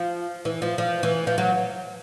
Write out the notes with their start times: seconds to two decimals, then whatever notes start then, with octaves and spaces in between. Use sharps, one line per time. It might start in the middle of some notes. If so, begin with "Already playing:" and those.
Already playing: F3
0.45 E3
0.62 F3
0.78 F3
1.03 E3
1.27 F3
1.38 F#3